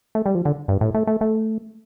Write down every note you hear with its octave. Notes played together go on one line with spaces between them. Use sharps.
A3
G3
F3
D3
G2
A2
A3
A3
A3